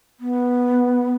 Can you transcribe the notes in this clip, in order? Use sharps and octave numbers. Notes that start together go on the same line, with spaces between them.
B3